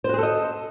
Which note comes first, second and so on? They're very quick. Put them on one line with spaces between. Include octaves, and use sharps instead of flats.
C5 F#4 G#4 A4 D#5